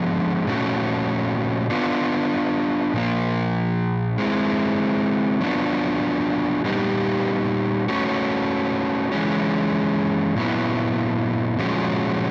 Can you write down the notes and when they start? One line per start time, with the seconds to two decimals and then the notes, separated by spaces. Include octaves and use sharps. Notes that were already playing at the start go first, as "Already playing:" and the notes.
Already playing: D3 F3 G#3 B3
0.47 A#2 F3 A3 C#4 F#4
1.70 B3 D4 F4
2.94 A#2 F3 A#3
4.18 G#3 C4 E4
5.41 F#3 B3 D4 F4
6.64 A#2 G3 B3 D#4 G4
7.88 A3 C#4 F#4
9.12 E3 G#3 C#4
10.35 A#2 F#3 B3 E4
11.58 A#2 F3 G#3 C#4 F#4